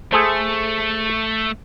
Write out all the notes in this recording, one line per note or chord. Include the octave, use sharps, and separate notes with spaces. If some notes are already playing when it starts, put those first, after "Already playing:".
A3 G#4 A4 C5